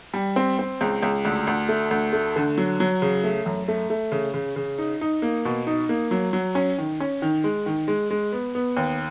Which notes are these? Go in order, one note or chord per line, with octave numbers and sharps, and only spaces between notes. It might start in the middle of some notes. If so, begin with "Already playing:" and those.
G3
C4
C4
C#2
C#2
D2
D2
A3
D2
A3
D3
F#3
F#3
C#3
A3
F#2
A3
A3
C#3
C#3
C#3
D#4
D#4
A#3
B2
D#4
A#3
F#3
F#3
C#4
D#3
C#4
D#3
G#3
D#3
G#3
G#3
B3
B3
D#2